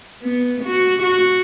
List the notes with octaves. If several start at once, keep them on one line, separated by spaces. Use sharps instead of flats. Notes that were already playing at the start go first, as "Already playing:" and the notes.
B3
F#4
F#4